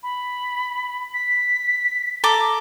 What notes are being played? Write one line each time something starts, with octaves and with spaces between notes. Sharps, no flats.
B5
B6
A4 A#5 D6